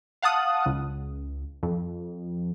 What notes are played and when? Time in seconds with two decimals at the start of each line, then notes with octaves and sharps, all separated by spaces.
0.22 F5 F#5 A5 D#6 F#6
0.66 C#2
1.63 F2